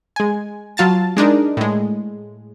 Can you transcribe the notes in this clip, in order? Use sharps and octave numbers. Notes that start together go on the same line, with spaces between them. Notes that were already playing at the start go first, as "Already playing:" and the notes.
G#3 G#5
F#3 F4 A5 A6
G#3 D4 D#4 A#4
A2 G#3